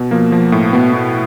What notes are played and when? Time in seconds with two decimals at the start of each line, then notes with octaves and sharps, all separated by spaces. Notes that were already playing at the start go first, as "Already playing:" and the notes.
Already playing: B2
0.11 F3 A#3
0.32 F3
0.52 A2
0.73 B2 B3
0.93 B2